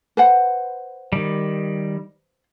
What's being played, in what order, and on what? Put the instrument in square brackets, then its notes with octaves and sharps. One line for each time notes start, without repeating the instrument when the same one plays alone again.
[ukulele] B4 C5 F#5
[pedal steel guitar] D#3 G3